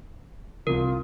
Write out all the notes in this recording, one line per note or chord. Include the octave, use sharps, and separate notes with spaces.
C2 C3 F4 A#4